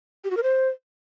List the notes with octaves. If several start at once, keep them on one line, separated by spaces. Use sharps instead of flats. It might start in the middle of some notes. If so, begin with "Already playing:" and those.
G4
F#4
A#4
C5